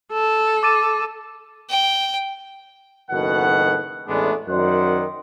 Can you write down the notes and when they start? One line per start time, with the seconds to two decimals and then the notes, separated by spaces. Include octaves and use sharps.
0.13 A4
0.63 D6 A6 D#7
1.70 G5
3.11 F#1 B2 D#3 A4 F#5
4.07 A1 E2 G#3 A3 B3 D4
4.48 F#2 D#3 C5 D5 F#5